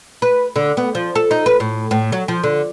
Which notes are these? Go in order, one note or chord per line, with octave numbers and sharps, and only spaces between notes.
B4
D3
B3
F3
A4
D#4
B4
A2
A2
F#3
F3
D3